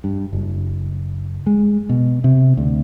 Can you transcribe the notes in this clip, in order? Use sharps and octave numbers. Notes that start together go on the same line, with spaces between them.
G2
F#1
G#3
B2
C3
D2